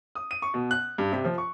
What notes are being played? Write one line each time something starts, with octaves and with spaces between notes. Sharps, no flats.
D#6
D#7
C#6
B2
F#6
G2
C3
F3
C#6